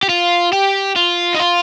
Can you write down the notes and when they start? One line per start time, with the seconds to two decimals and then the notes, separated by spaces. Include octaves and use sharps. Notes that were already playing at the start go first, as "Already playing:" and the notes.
0.03 G4
0.09 F4
0.52 G4
0.96 F4
1.34 D#4
1.39 F4